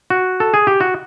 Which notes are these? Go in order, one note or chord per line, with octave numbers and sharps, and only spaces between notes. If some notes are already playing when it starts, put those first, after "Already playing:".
F#4
A4
G#4
G4
F#4